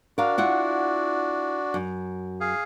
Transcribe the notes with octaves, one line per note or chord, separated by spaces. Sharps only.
D4 F#4 A#4 F5
E4 F4 F#5
F#2
G#4 F5